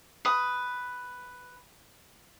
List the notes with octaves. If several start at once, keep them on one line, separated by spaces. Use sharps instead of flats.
B4 D#6